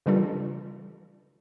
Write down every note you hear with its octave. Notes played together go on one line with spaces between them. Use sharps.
C#3 E3 G3 D4 F4 A4